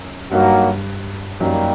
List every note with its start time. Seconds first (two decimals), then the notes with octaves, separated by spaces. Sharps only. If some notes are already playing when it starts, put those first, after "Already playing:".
Already playing: F#2
0.31 G2 F#3 G3 A#3 D#4 F#4
1.40 F#2 F#3 G3 A#3 D#4 G4